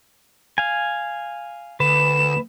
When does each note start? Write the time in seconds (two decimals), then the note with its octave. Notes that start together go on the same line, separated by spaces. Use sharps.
0.58 F5 G#5
1.80 D2 B4 E7